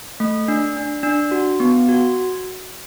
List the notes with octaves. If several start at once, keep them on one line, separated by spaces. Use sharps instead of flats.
A3
D4
D4
D4
F#4
B3
F#4